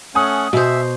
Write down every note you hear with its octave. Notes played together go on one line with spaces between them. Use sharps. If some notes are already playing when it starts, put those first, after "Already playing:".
A3 C#4 F#5 G#5 D#6
B2 C5 E5